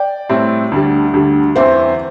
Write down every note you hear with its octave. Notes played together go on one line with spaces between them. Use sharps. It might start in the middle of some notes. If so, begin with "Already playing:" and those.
Already playing: D5 G5
A2 G3 C4 E4
D2 D3 G3
D2 D3 G3
E2 E3 C4 C5 E5